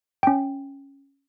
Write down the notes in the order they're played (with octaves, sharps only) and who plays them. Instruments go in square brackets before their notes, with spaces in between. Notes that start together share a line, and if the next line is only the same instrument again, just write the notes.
[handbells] C#4 G5